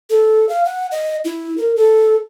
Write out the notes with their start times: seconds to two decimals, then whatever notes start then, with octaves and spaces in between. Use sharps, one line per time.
0.10 A4
0.49 F5
0.65 F#5
0.92 D#5
1.25 E4
1.58 A#4
1.76 A4